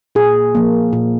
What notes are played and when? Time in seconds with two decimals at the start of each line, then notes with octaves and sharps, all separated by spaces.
0.15 A#2 G#4
0.55 F3 A#3
0.93 A#2